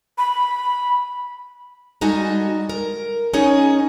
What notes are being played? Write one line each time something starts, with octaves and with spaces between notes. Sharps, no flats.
B5
G3 G#3 D#4 F#4 A4 G#5
A#4
C#4 D#4 G#4 C#5